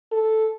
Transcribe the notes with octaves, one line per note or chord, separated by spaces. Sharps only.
A4